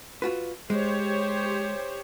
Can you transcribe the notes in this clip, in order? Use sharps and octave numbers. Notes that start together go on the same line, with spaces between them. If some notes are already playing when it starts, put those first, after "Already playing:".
F4 F#4 B4
G#3 G4 C5 C#5